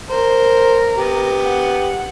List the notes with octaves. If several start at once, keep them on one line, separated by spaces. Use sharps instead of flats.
A#4 C5
B3 G4
F#5